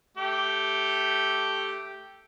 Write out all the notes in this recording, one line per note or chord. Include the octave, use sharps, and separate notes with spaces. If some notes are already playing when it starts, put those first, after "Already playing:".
A3 G4